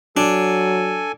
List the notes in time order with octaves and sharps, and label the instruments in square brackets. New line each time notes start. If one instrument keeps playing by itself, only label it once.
[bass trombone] F#3 [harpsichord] D4 [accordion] A4 G#5